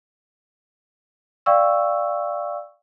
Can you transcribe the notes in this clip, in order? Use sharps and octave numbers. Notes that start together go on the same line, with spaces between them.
D5 F5 G5 C#6 E6